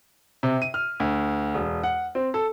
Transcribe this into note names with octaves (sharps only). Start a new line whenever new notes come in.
C3
D#7
F6
D2
E1
F#5
C4
A4